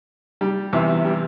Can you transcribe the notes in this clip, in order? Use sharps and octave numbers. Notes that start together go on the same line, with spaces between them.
G3
E2 C3 E3
G3